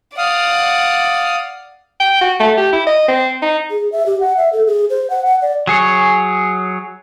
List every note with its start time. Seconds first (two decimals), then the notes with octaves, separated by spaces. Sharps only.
0.18 D5 F5 F#5 D#6
2.00 G5
2.21 F#4
2.40 A3
2.57 G4
2.72 E4
2.86 D#5
3.08 C4
3.42 D#4
3.70 G#4
3.92 E5
4.06 G4
4.20 F#5
4.37 E5
4.53 A4
4.67 G#4
4.90 C5
5.10 F#5
5.26 F#5
5.42 D5
5.67 F#3 G#4 C#5